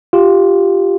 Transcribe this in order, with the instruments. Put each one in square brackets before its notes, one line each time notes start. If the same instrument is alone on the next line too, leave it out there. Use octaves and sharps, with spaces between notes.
[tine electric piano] F4 G4